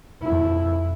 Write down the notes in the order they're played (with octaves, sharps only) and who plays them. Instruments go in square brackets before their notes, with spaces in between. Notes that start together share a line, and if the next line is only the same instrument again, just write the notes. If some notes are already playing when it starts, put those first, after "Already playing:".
[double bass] F2 E4